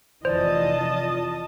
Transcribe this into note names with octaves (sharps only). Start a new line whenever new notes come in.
F1 E3 F4 C5 D5 D#5 A5